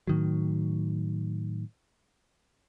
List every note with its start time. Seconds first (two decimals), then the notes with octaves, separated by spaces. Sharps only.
0.07 A2 D#3 F#3